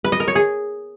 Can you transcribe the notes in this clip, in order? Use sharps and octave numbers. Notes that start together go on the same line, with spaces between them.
B4
D#5
A#4
C#5
G#4